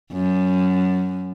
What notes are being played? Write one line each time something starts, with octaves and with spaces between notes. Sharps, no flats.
F#2